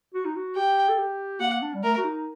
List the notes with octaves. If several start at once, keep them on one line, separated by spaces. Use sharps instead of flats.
F#4
D#4
F#4
G4 G5
A4
G4
A#3 F#5
D4
G3
A3 A#4
F#4
D#4